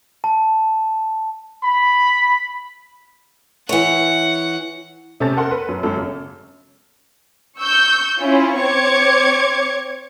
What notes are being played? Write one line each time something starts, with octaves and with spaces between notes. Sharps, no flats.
A5
B5
E3 C#5 F#5
C3 A3 C#4 A5 A6
A4 A#4 F#5 C6
B4
F#2
G#1 F#2 A4
C#3
C#6 E6 G6
C#4 E4 F4
C4 C#5 C#6 D6 G#6 C#7